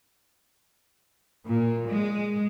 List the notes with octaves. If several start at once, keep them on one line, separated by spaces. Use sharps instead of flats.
A#2
G#3